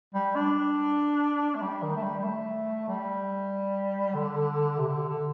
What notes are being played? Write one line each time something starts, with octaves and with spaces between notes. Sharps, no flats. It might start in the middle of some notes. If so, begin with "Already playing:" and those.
G3
D4
A3
G3
D#3
A3
G3
G3
A3
G3
D3
C3
C3
D3
D3